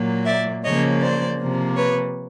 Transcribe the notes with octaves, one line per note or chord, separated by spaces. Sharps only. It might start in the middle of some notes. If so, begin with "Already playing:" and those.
Already playing: A#2 F#3 A#3
D5 E5
C#3 F3 A#3 C#5 D#5
C5 D5
C3 F3 A#3
B4 C#5